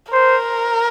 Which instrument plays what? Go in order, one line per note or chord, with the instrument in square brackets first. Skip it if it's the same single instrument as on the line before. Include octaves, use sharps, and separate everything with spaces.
[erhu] A#4 [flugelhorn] C5